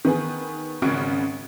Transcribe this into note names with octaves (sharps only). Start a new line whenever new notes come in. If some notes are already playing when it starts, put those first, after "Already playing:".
D#3 B3 G#4
G#1 C#3 C#4 F#4 C#6 D7